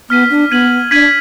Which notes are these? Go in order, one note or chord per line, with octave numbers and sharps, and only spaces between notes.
B3 F6 B6 D#7
D4
B3 G#6 B6 D#7 F#7
D4 G#6 B6 D#7 F#7